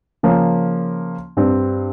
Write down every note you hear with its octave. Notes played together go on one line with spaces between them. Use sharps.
C#3 F3 A#3 C#4
G2 G3 C4